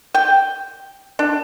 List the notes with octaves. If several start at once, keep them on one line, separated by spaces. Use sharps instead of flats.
G5
D4